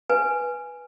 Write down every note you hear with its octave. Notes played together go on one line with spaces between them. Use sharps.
B4 G#5